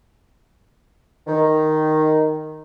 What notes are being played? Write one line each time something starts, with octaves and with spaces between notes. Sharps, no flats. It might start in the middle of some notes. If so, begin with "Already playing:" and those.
D#3